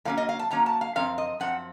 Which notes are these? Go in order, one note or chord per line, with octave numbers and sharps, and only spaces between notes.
A2 F#3 A#3 C#4 F5
D#5
F5
A5
A2 F#3 A#3 C#4 A#5
A5
F5
F#2 F3 C4 F5
D#5
F#2 F3 C4 F#5